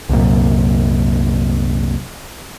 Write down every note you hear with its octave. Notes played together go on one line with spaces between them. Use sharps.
C2 F#2 A#2